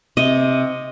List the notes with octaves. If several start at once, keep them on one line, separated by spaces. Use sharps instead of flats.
C3 D#5